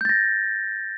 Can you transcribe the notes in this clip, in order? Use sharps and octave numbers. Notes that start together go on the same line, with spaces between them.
G6 A6 A#6